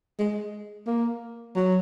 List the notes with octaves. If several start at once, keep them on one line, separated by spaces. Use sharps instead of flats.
G#3
A#3
F#3